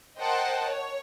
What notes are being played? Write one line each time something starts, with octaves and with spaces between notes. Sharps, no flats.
A#4 C5 D#5 F#5 G5 A5
C#5